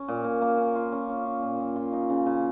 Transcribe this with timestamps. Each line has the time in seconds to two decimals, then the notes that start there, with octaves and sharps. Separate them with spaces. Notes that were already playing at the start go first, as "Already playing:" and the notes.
Already playing: C#4
0.08 A#2
0.24 A#2
0.41 A#3
0.58 C#4
0.75 F4
0.92 C#4
1.09 C#4
1.25 F4
1.42 A#2
1.59 A#2
1.76 F4
1.92 D#4
2.09 C#3
2.26 C#3